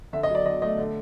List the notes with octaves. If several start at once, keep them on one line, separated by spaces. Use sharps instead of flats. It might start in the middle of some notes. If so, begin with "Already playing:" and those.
D3 E5
D#5
F#3 D5
D3 D#5
A3 D#5
D3